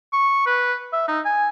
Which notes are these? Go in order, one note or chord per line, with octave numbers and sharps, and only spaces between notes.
C#6
B4
E5
D#4
G#5